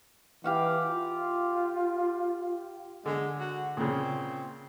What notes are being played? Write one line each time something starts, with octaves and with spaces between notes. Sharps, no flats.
E3 G4 F5 F#5
F4
D3 G#3
F#4
A#2 C#3 C4